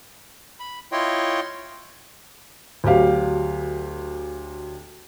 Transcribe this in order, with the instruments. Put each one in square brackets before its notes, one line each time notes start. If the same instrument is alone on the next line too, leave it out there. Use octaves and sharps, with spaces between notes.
[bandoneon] B5
E4 F4 C#5 D#5 G5 C6
[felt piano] D2 F#3 G4 F5